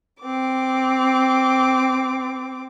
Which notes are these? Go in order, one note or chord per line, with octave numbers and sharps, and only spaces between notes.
C4 D6